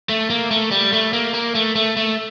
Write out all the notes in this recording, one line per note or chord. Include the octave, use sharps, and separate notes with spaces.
A3
A#3
A3
G3
A3
A#3
A#3
A3
A3
A3